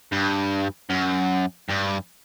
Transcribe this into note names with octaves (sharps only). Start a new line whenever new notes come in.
G2
F#2
G2